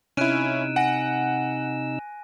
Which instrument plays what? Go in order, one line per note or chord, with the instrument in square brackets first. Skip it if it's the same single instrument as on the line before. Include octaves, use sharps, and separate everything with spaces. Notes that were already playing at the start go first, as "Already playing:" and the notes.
[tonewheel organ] C3 D#4 E6 [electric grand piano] C#4 E4 [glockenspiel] F#6 D7 D#7
[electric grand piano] F#5 [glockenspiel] G#5 A#6